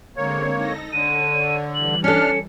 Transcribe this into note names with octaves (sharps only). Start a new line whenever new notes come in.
D3 G#3 A#3 C4 C#5
D#4 A4 A#6
D3 C#5 D#7
E3 G3 F#7
C#4 D4 A4 F6 C#7